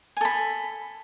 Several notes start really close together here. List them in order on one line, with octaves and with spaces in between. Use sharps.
G#5 A4 B5